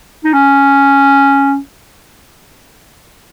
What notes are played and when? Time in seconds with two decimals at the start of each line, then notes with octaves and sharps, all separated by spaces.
0.25 D#4
0.33 C#4